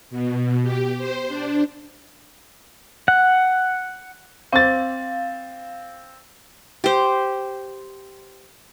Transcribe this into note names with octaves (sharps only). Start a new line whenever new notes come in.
B2
G4
C5
D4
F#5
C4 F5 A6
G4 C5